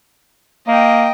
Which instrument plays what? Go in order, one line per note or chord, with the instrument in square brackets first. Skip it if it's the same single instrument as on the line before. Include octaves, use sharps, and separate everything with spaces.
[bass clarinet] A#3 [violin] D#5 G5